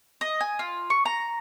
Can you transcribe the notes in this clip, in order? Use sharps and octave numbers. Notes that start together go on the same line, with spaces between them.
D#5
G#5
F4
C#6
A#5